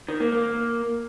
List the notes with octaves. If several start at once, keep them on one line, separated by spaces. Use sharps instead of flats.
D#3
A#3
A#3